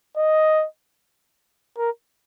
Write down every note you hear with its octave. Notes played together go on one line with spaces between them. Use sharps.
D#5
A#4